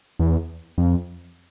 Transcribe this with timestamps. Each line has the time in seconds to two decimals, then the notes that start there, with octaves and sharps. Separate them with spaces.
0.19 E2
0.78 F2